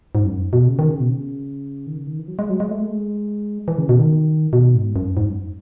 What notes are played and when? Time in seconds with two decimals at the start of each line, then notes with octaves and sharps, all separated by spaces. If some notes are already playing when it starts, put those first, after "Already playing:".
0.15 G#2
0.24 F#2
0.53 B2
0.68 C#3
0.79 D#3
0.89 C#3
1.00 B2
1.10 C#3
1.87 D#3
1.96 C#3
2.07 D#3
2.18 E3
2.28 F#3
2.39 G#3
2.50 F#3
2.60 G#3
2.71 A3
2.82 G#3
3.68 E3
3.78 C#3
3.89 B2
3.99 D#3
4.53 B2
4.75 G#2
4.96 F#2
5.17 G#2
5.28 F#2